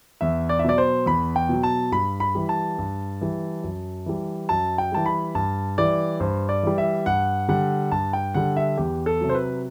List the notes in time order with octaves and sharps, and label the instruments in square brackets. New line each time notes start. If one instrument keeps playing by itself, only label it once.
[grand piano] E2 E5
D5
E5
B2 F#3 D5
C5
E2 B5
G5
B2 F#3
A5
G2 B5
B5
E3 G3
A5
G2
E3 G3
F#2
E3 G3
F#2 A5
G5
E3 G3 A5
B5
G2 A5
E3 G3 D5
G2 C5
D5
E3 G3
E5
G2 F#5
D3 G3 F#5
G2 A5
G5
D3 G3 F#5
E5
E2 G4
A4
C3 F#3
C5
B4